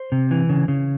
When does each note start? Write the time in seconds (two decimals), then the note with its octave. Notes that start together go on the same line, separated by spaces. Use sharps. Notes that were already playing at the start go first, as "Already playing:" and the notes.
Already playing: C5
0.12 C3
0.31 E3
0.49 C#3
0.68 C#3